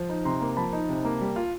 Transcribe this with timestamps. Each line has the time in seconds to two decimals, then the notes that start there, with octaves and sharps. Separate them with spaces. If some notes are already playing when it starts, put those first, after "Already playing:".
Already playing: F3
0.09 D#4
0.25 C3 A#5 C6
0.41 A#3
0.57 F3 A5 B5
0.73 D#4
0.89 C3
1.05 A#3
1.21 G3
1.36 F4